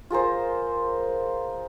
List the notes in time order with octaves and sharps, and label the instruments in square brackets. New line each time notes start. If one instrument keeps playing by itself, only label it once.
[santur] F4 G#4 A#4 C5